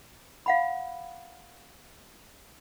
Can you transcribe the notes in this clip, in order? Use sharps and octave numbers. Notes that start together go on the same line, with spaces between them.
F5 F#5 B5